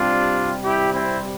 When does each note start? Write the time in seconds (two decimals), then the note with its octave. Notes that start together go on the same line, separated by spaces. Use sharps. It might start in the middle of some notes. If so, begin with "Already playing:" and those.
Already playing: C3 G3 C4 D4 F4
0.64 E4 G4
0.93 C4 E4